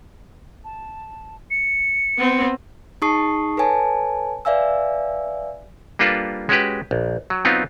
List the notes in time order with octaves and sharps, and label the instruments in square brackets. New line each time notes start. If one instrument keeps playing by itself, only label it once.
[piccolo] A5
C#7
[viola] B3 C4
[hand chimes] D#4 G#4 A5 C#6 D#6 C7
A4 B4 C#5 G#5 A5
B4 D5 E5 F5 G#5 E6
[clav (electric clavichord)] G3 A#3 D4 F4 A4 B4
G#3 C#4 F#4 G4 B4
A#1
F#3
F#3 B3 C4 D#4 F4